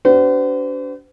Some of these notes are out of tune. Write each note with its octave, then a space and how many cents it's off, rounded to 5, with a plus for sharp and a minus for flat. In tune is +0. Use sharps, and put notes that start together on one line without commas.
D4 -40 F#4 +40 C5 -45